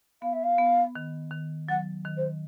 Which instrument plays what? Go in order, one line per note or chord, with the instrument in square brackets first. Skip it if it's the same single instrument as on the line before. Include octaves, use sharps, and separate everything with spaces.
[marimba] B3 [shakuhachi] F5
[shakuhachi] E5
F5
[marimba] B3
D#3
D#3
[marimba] F#3 [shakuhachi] F#5
[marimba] D#3
[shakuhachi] C5